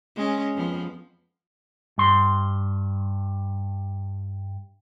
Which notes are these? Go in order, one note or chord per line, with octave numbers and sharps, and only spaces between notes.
G#3 C#4
F2 F3 B3
G2 C6